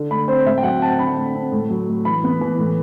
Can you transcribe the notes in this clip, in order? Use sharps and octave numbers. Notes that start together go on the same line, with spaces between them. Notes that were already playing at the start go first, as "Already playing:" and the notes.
Already playing: D3
A3 B5
C4 C5
A2 E5
G5
F#3 F#5
C4 A5
D3 B5
A3
C4
A2
F#3
A3
E3 B5
B3
E3
A2